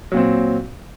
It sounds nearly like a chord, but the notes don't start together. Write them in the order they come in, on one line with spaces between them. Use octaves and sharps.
F#3 A#2 C4